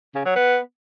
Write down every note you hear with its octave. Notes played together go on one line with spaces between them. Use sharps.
C#3
F#3
B3